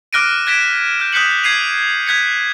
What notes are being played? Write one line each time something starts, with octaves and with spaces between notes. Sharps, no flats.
D6 F6 F#6 A#6 D7 D#7
F#6 G#6 A#6 B6 D7 E7
F6 G6
D#6 F#6 G6 B6 C#7 F#7
G#6 C7 D#7 F7
F#6 G#6 B6 C#7